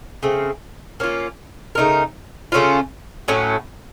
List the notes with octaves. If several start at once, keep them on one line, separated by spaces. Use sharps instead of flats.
C#3 A3 C4
A#3 C#4 F4
C#3 A3 D#4 A#4
C#3 A3 C#4 F4
A2 F#3 A3 C#4